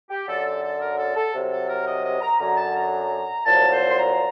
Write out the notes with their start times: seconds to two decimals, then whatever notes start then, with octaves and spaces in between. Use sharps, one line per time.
0.09 G4
0.27 F#2 D3 F#3 A4
0.44 A4
0.62 A4
0.79 A#4
0.97 A4
1.15 A4
1.33 C2 C3 F#3
1.50 A4
1.68 A#4
1.86 D#5
2.04 D#5
2.21 A#5
2.39 F#2 D3 F#3 A#5
2.56 A5
2.75 A#5
3.45 C2 A#2 F#3 A5
3.72 C5
3.89 C6
3.98 A#5